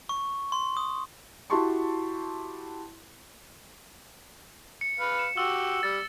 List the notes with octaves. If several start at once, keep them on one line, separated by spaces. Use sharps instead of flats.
C#6
C6
D#6
E4 F#4 G4 A5 C6 C#6
C#7
B4 F5
E7
F#4 G4 E6 G7
G3 A6